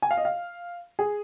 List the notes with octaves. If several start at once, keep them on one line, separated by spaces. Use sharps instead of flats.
G#5
F5
D#5
F5
G#4